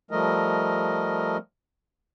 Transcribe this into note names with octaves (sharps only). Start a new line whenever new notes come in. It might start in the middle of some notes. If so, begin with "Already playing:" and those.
F3 G3 A3 A#4 D#5